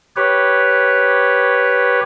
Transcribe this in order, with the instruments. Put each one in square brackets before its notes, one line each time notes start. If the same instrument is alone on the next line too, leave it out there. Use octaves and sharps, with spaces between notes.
[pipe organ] G4 B4 C#5